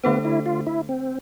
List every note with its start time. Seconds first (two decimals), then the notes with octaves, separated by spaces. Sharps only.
0.04 D3 A3 B3 D4 A4 C5
0.25 E4
0.46 F4
0.67 E4
0.89 C4